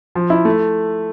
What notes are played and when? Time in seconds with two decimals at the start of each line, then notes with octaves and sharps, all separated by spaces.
0.15 F3
0.30 E4
0.45 A3